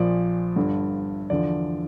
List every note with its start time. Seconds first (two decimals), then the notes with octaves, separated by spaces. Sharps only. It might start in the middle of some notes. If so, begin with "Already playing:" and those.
Already playing: A#1 A#2 F3 D5
0.56 G1 G2 D3
1.30 E2 D3 F3 D5